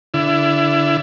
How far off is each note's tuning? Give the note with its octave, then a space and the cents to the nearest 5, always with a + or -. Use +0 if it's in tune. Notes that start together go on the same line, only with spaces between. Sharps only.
D3 -15 E4 +20